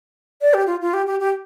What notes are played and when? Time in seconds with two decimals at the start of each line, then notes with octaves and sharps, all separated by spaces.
0.41 D5
0.54 G4
0.67 F4
0.81 F4
0.94 G4
1.07 G4
1.20 G4